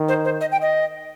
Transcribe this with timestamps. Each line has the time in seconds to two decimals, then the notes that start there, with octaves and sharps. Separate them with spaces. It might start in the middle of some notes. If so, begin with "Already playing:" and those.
Already playing: D#3
0.08 C5
0.24 C5
0.41 D#5
0.52 G5
0.62 D#5